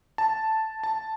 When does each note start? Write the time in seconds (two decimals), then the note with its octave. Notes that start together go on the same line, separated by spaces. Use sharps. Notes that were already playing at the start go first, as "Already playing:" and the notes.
0.18 A5
0.83 A5